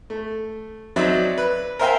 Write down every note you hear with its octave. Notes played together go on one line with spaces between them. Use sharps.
A3
F#3 C4 D#4 C5 D5 E5
B4
A#4 C5 E5 F5 G5 G#5